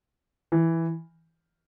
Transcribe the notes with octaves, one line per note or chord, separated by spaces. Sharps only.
E3